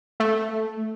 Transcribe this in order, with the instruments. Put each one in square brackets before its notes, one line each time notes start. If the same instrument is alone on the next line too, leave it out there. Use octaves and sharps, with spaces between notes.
[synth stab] A3